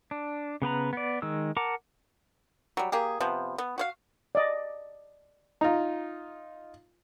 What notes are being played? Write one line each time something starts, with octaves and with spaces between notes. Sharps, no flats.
D4
C#3 B3 B4 A#5
B3 D5
D#3 G#3 E6
A#4 F#5 A5 A#5 D6
F#3 G3
A#3 G4 G#4
C3 F3 B3
B3
F#4 C#5 F5
D5 D#5
D#4 F4 A#5